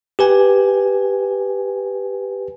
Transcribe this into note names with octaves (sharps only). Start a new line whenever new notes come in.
G4 B4 G#5